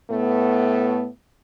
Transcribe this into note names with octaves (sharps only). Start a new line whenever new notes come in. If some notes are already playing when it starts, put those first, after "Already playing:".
A2 A3 B3